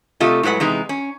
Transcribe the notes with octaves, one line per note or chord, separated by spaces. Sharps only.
C3 A3 F4 G4 A4 D#5
A2 F#3 G#3 B4 F#5
E2 C3 G#3 B3 D#4
C#4